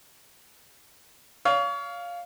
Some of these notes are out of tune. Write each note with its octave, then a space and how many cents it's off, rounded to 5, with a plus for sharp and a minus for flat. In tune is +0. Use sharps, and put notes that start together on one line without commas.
C#5 +35 F5 +0